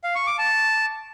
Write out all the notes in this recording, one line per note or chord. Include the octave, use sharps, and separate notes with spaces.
F5
C#6
D6
A5